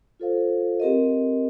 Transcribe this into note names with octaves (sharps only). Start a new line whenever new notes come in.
F4 A4 C5 F5
C4 G4 A#4 D#5